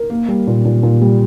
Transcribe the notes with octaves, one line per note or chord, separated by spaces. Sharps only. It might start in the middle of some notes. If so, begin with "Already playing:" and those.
Already playing: A#4
A#3
G3
A#2
A#2
A#2
G3